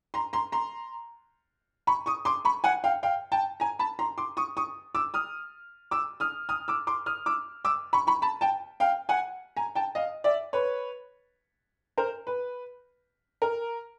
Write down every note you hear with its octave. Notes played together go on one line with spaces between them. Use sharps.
A#5 C6
A#5 C6
A#5 C6
B5 C#6
C#6 D#6
C6 D6
B5 C#6
F#5 G#5
F5 G5
F5 G5
G5 A5
G#5 A#5
A5 B5
A#5 C6
C6 D6
C#6 D#6
C#6 D#6
D6 E6
D#6 F6
D6 E6
D#6 F6
D#6 F6
D6 E6
C6 D6
D#6 F6
D6 E6
D6 E6
B5 C#6
B5 C#6
A5 B5
G5 A5
F5 G5
F#5 G#5
G#5 A#5
G5 A5
D#5 F5
D5 E5
B4 C#5
A#4 C5
B4
A#4